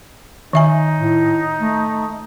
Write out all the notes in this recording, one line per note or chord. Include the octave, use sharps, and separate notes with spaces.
D#3 D#4 E5 G#5
A2
A3